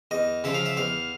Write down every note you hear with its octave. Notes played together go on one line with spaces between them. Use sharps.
E2 D#5
C#3 F3 E5
F5
E5
E2 F5